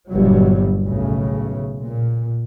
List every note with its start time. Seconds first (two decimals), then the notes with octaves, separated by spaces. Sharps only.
0.10 G1 A#2 F#3 G3
0.85 B1 A2 C#3
1.83 A#2